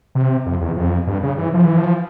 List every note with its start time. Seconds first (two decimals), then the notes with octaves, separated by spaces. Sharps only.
0.15 C3
0.46 F2
0.61 E2
0.76 F2
1.07 G2
1.23 C#3
1.38 E3
1.54 F3
1.65 E3
1.77 F3